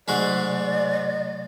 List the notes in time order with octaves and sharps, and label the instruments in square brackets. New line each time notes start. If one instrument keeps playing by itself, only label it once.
[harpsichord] G#2 G#3 F#4 [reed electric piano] C3 F#3 A3 [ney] D5